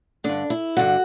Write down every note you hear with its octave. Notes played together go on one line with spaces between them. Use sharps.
G2 D3 D4
E4
G2 D3 F#4